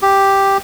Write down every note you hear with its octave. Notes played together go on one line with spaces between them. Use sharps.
G4